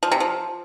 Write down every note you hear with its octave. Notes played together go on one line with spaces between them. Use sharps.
F3
C3
F3